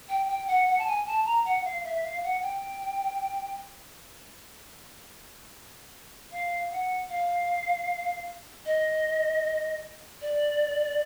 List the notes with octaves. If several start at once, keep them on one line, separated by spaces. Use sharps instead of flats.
G5
G5
F#5
F#5
A5
G#5
A5
A#5
F#5
F5
E5
F5
F#5
G5
F5
F#5
F5
D#5
D5